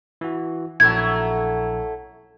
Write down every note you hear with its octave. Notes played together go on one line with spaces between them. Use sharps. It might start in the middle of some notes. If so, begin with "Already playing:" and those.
E3 F#4
A#1 F#3 A3 E4 G#6